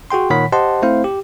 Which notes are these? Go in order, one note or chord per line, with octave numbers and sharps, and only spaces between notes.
F#4 G#4 G5 C6
A#2 D#3 C#5 F#5 B5 B6
G4 C5 D#5 F#5 A5 C6
A3 C4 E4 C5 F5
G4